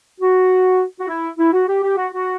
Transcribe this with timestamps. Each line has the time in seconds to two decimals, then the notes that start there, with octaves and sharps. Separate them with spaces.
0.20 F#4
0.99 F#4
1.08 E4
1.39 E4
1.53 F#4
1.68 G4
1.83 G4
1.97 F#4
2.13 F#4